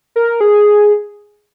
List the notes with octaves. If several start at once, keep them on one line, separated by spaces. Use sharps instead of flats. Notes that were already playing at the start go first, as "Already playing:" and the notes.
A#4
G#4